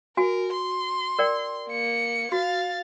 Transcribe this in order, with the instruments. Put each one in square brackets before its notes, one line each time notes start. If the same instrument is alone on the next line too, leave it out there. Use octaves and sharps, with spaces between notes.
[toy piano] F#4 G#5 [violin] A#4
[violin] C6
[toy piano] A#4 D5 G5
[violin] A#3 C#7
[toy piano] F#4 [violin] F5 A6